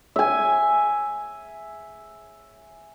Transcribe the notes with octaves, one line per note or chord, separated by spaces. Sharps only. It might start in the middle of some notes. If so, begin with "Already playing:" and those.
E5 G#5